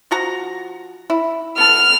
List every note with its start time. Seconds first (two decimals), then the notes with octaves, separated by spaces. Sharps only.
0.11 F3 F#4 A#5
1.10 E4
1.58 B3 A4 F6